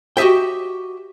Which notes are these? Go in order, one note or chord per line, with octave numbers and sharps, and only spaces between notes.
F#4 G4 D#5 E5 G5